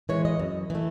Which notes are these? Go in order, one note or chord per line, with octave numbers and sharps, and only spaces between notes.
E3 G#3 C#5
D#5
F#2
E3 A3